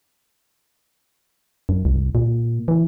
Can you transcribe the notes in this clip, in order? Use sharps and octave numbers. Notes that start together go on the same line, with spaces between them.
F#2
C2
A#2
E3